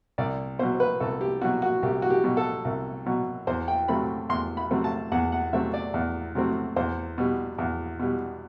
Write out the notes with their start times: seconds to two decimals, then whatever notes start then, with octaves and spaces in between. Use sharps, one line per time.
0.18 C2 D5
0.59 B2 C5
0.63 F#3
0.80 B4
1.00 C2 A4
1.21 G4
1.41 B2 F#3 F#4
1.62 F#4
1.83 C2 G4
2.02 F#4
2.10 G4
2.24 B2 F#3
2.37 A4
2.65 C2
3.06 B2 F#3
3.47 E2 C5
3.68 G5
3.88 C3 F#3 A3 C4 B5
4.29 E2 C6
4.57 B5
4.71 C3 F#3 A3 C4
4.84 A5
5.12 E2 F#5
5.32 F#5
5.53 C3 F#3 A3 C4 E5
5.74 D5
5.94 E2
6.35 C3 F#3 A3 C4
6.76 E2 C5
7.18 B2 G3
7.58 E2
8.00 B2 G3